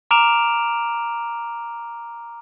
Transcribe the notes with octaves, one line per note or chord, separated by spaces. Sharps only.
A#5 D6 F6 D7 E7 F7